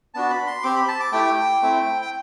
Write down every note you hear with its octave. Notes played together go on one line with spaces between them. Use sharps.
B3 D4 F#4 A5
B5
C6
C4 G4 D6
B5
A5
D6
A3 E4 G4 G5
A3 C4 E4
G5